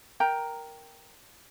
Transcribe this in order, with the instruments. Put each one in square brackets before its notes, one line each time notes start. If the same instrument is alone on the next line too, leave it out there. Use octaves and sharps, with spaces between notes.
[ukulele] A#4 G5 A#5